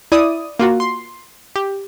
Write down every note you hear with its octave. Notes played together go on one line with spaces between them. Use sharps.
E4 D5 D#6
A#3 F4 F#4
C6
G4